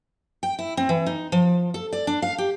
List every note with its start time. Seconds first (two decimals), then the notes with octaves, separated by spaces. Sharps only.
0.43 G5
0.59 E4
0.77 C4
0.89 E3
1.06 D#4
1.32 F3
1.74 A4
1.93 D5
2.07 D4
2.22 F5
2.38 G4